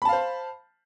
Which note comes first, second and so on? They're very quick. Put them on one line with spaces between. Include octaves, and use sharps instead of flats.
B5 A5 F5 C5